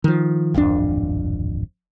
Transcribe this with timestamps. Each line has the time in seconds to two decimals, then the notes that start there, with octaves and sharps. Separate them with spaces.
0.04 D#3 F3
0.54 D1 G#1 F2 D4